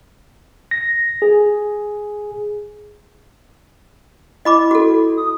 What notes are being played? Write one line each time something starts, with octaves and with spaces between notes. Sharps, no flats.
A#6
G#4
E4 D#5 B5 D6
F#4 A4
D#6